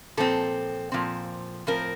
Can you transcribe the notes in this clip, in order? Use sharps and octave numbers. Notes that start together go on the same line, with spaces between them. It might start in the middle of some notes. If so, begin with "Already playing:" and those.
A#2 F3 C4 A4
A#2 F3 C4
A2 F3 C4 A#4